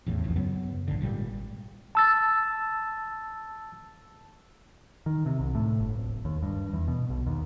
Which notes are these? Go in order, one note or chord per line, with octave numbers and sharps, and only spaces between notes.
A1 E2 A2
D#1 B1 F2
F#2 C#3 F#3 B3
A1 D3
G#1 A#2 G3
A5 E6 A6
D#3
C3
C2
A2
G1
D1
D#2
G2
E2
B2
B1
D#2